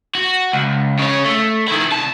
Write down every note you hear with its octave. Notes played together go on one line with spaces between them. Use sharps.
F#4
C#2
C#3 C#5
A3
D#3 E4
C2 A5